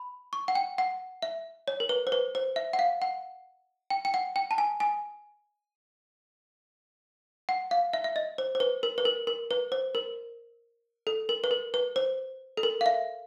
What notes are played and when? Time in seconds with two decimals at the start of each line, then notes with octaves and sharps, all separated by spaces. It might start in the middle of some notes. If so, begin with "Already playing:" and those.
Already playing: B5
0.33 C#6
0.48 F#5
0.55 G5
0.78 F#5
1.22 E5
1.68 C#5
1.80 A#4
1.89 B4
2.07 C5
2.12 B4
2.35 C5
2.56 E5
2.73 F#5
2.79 F5
3.02 F#5
3.90 G5
4.05 G5
4.14 F#5
4.36 G5
4.51 A5
4.58 G#5
4.80 G#5
7.49 F#5
7.71 F5
7.93 E5
8.04 E5
8.16 D#5
8.38 C5
8.55 C5
8.60 B4
8.83 A#4
8.98 B4
9.05 A#4
9.27 A#4
9.51 B4
9.72 C5
9.95 A#4
11.07 A4
11.29 A#4
11.44 B4
11.51 A#4
11.74 B4
11.96 C5
12.57 A4
12.63 A#4
12.81 F5
12.86 E5